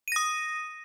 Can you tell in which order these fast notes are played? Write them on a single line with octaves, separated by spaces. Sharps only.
D#7 A#6 D#6